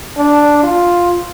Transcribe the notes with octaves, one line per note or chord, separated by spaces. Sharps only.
D4
F4